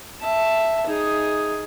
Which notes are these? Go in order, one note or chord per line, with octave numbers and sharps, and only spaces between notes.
E5 A5
D#4 G#4